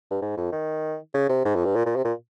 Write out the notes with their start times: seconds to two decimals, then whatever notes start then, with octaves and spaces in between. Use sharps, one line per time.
0.11 G2
0.22 G#2
0.37 F2
0.52 D#3
1.14 C#3
1.29 C3
1.45 G#2
1.55 F2
1.65 G2
1.76 A#2
1.86 A#2
1.96 C3
2.05 A#2